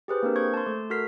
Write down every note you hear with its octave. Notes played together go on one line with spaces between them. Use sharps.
G4 G#4 B4 C5
A#3 C4 D4 A#4
C5 C#6 G#6
A5 C6
A3 A4
F#4 A4 A#4 F6 B6 C7